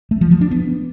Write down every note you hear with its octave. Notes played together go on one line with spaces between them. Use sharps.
A3
F3
F3
D4
B3